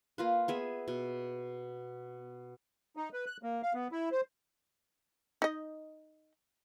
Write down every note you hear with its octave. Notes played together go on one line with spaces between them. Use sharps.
A#3 F4 B4
B3 G#4 E5
B2
D#4
B4
F#6
A#3
F5
B3
E4
C5
D#4 D#5